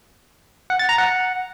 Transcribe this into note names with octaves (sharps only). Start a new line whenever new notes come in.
F#5
A6
A#5
F#5